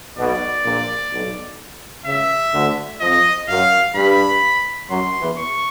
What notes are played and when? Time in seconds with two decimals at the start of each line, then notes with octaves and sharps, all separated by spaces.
0.18 B1 B2 D5
0.65 A#1 A#2
1.13 B1 B2
2.06 C#2 C#3 E5
2.54 D2 D3
3.01 F2 F3 D#5
3.48 F#2 F#3 F5
3.95 G2 G3 B5
4.90 F#2 F#3 C6
5.21 E2 E3
5.37 C#6